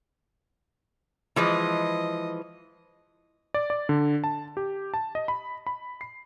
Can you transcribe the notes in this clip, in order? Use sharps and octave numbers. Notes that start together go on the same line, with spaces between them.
E3 F3 G#3 D#5
D5
D5
D3
A5
G4
A5
D#5
B5
B5
C7